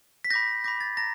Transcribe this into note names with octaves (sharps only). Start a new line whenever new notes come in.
B6
B5 D6 G6 A#6
B5 D6 G6 A#6
A6
A#5 A#6